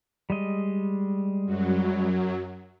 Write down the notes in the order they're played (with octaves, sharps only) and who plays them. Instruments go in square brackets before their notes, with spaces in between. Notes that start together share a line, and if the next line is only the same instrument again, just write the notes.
[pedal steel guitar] G3 G#3 D#5
[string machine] F#2 F#3